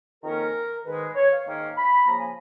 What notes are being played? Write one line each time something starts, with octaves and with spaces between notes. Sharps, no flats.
F2 D#3 A#3 C#4 A#4
G#2 D#3 G#3 B4
C#5
F5
G#2 D#3 A#3 C#4
B5
C#3 F3 A#3 A#5
G#5